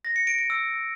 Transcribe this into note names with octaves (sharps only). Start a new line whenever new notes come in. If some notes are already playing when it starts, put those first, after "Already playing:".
A#6
C#7
D7
D7
E6